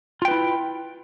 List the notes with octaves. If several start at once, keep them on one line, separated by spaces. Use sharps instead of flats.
E4 F4 B4 G5